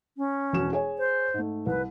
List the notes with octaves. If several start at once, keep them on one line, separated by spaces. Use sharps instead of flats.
C#4
E1 F#4 E7
G#4 C#5 G#5
C5
G#2 A3
C2 B4